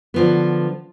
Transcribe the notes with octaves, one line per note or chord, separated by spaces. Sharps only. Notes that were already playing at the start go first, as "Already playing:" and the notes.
D3 F3 B3